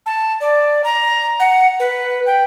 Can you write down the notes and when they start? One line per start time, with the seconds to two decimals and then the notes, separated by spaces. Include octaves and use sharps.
0.06 A5
0.41 D5
0.84 A#5
1.40 F#5
1.79 B4
2.26 G5